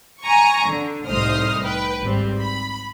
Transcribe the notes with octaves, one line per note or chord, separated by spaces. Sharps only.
G#5 A#5 C#6
D3
C2 A2 D#4 C5 D#6 F6
B4 G5
G#1 G3 C4
B5